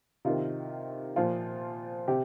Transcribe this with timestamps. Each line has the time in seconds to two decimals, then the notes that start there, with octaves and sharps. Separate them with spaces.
0.25 C3 D#3 F4
1.16 A#2 F3 F4
2.08 C3 G4